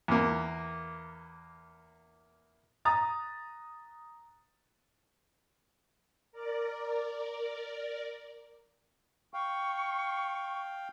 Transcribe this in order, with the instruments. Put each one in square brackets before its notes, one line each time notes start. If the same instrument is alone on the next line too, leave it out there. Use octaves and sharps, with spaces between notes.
[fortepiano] E2 A#3
[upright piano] A#5 D#6 A6
[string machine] A#4 D5
[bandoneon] F5 G5 [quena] C#6